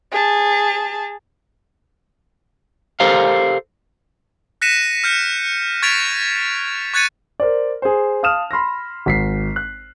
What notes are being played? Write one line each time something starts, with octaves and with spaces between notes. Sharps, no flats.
G#4 A5
G4 A4 A#4 C5 F5
F#6 A#6 B6 C#7 D#7 E7
F6 G6 C#7
C#6 G#6 A6 B6 D7 F7
C#6 F#6 G#6 A6 C#7 D#7
A#4 C5 D5
G#4 C5
F5 A5 D#6 F6 E7
B5 C6 F6 A#6
G#1 B6 C7
F#6